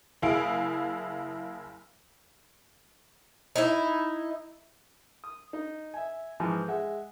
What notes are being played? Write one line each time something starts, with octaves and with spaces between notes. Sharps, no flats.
F#1 E4 G#4 F5 D7
D#4 E4
D#6
D#4
E5 G#5
G#2 E3 F3 G#3
G#3 E5 F#5